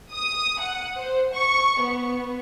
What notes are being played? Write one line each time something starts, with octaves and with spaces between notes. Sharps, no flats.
D#6
F#5
C5
C#6
B3